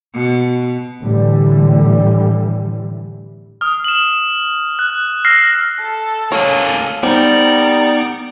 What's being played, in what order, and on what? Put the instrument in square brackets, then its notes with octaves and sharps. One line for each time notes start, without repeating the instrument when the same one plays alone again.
[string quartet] B2
[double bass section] A2 D3 E3 G3
[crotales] D#6 F6
E7 F#7
F#6
E6 F6 A#6 C7
[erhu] A4
[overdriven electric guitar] A#3 G#4 [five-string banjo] C#5
[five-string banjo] G3 C4 [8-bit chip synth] B3 D#4 [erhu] A#4 [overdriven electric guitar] D5